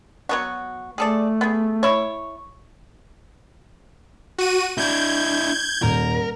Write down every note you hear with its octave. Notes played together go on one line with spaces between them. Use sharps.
F#3 B3 F#4
A3 G#4 A4 D5
B3 G#4
E4 C#5
F#4 D#7
D4 E4 G6 G#6
D#1 A#4